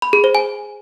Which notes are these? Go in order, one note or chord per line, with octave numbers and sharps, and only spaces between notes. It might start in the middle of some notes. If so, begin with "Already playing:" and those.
B5
G#4
C5
G#5